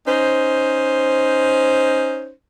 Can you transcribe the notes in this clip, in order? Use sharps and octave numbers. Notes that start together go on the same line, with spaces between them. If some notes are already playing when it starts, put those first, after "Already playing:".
C#4 D#4 C5